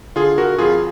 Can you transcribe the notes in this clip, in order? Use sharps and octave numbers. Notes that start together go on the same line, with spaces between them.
D3 F4 G#4
F#4 A#4
F2 F4 G#4